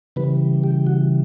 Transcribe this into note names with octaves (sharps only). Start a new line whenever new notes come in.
C#3 E3 G3 B4
G4
F#4